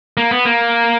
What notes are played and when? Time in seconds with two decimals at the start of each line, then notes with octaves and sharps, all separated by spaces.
0.17 A#3
0.31 B3
0.45 A#3